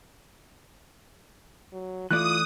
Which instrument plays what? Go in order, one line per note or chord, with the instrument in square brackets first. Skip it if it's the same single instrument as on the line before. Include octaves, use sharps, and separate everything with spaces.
[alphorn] F#3
[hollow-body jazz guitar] E3 A3 D5 [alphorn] F4 [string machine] D#6 [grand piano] F#6